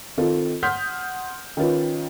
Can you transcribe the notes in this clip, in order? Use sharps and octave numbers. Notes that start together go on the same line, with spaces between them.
D#3 C4 F4 A4
F#5 C6 D#6 F6 G6 B6
D#3 C#4 F4 B4